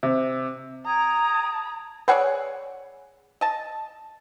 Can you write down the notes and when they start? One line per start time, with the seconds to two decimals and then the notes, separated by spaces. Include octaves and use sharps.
0.03 C3
0.86 G5 A#5 D#6 G#6
2.08 G#4 B4 C#5 D5 F#5 E6
3.41 D#5 A5